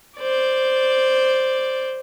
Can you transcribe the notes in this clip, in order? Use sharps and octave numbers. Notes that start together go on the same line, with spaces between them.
C5 D5